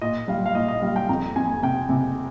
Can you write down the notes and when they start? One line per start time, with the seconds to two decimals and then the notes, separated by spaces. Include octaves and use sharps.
0.02 A#2 D#5
0.28 G3 F5
0.46 F5
0.55 A#2 D#5
0.68 D#5
0.82 G3 F5
0.96 G5
1.09 F2 A#5
1.36 F2 G#5
1.63 C3 G5
1.89 C3